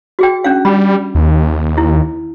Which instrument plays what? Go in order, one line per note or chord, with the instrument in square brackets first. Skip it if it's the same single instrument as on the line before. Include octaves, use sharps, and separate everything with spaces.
[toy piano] F#4 G#4 G5
C#4 D4 F5
[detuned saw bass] G3 [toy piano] B5
[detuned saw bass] D#2
[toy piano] E4